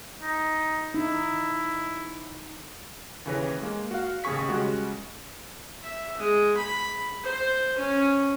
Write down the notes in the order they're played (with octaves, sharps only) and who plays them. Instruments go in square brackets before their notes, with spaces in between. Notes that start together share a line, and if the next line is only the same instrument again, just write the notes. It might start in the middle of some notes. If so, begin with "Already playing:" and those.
[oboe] D#4
[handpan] D#4 [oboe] E4
[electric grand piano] D#2 C#3 E3 B4 C#5 A#6
G#3 A#3
F#4 F5
A1 D#2 C#3 G#4 C#6 B6
C#3 G3 G#3 F#4
[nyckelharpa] E5
G#3
B5
C5
C#4